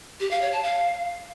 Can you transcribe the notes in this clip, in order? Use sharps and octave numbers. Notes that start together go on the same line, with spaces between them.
G4
F5
C#5
A5
F5